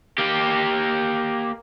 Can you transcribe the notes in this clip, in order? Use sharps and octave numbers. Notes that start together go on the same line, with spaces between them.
A#3 G4